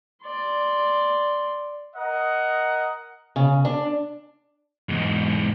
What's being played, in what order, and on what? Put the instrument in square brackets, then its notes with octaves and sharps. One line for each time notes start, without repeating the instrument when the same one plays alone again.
[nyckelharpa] D5 C6
[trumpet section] A#4 D#5 F#5
[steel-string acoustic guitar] C#3
D4
[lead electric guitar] E2 G#2